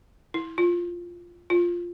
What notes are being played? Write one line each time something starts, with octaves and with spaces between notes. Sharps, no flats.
E4
F4
F4